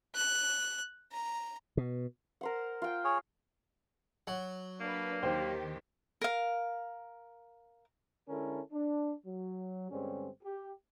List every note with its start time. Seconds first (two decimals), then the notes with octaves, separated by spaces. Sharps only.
0.15 F#6
1.12 A#5
1.77 B2
2.41 A#4 C5 F#5
2.82 F4 G5
3.04 G#4 C#5
4.27 F#3 F#5
4.80 A#3 D4 B4
5.23 D#2 D#3 G4 C5 G5
6.21 A#4 F5
8.29 D3 G#3 C#4 E4 A4 A#4
8.72 D4
9.26 F#3
9.91 G2 D3 G3 G#3 C4 C#4
10.43 G4